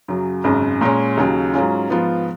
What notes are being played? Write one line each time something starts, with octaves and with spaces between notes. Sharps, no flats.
F#2 C#3 F#3
G#1 F#2 C#3
A#2 G#3 C#4
D#2 C#3 F#3
G#2 F#3 C#4 F4
G#2 F3 B3 F4